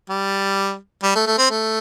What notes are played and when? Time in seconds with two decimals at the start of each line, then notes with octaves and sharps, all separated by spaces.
0.10 G3
1.03 G3
1.15 A3
1.27 A3
1.38 C4
1.50 A3